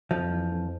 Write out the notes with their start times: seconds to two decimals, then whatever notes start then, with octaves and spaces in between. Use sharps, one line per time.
0.11 F2 F3
0.31 E3
0.52 F2